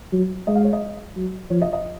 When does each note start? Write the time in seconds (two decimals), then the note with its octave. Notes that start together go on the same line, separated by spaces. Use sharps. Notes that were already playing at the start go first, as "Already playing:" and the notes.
0.12 F#3
0.47 G#3 D#5
0.55 F5
0.64 C#5
0.73 D#5
1.16 F#3
1.50 F3 C#5
1.62 D#5
1.73 D#5